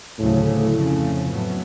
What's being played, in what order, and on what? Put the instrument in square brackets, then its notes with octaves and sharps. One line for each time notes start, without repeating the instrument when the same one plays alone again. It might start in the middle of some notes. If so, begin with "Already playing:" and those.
[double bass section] D2 C#3 F#3 [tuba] A2
[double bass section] F2 C#3 F3 A3 C#4
A2 F#3 B3